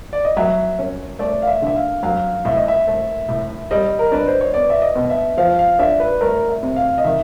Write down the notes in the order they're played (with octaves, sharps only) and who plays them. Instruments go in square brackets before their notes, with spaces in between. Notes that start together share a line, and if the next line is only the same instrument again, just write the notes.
[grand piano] D5
D#5
[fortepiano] F#3 [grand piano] E5
[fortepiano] C#4
[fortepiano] A3 [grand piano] D5
[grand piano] F5
E5
[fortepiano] D3 [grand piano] E5
[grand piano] F5
[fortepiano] F#3 [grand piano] F5
[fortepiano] A2 [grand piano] E5
[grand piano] D#5
E5
[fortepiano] A3
A2
[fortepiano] G3 [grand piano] D#5
[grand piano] A#4
[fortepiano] D4 [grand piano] B4
[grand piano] C5
C#5
[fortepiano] B3 [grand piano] D5
[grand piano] E5
D#5
[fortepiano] B2
[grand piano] E5
[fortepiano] F3 [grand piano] F5
[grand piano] F5
[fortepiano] D4 [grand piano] E5
[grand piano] B4
[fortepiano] A3 [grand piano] A#4
[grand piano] E5
[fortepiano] C3
[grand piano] F5
D#5
[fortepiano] D#3 [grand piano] E5